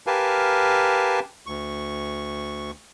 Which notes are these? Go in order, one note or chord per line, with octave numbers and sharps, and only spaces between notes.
G4 A#4 B4 F5 G#5 A5
D2 C#6